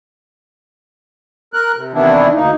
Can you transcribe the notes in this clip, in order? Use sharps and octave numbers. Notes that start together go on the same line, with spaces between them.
A#4 F#6
C3
C3 D#3 E3 B3 D4 E4
D2 A#3 D#4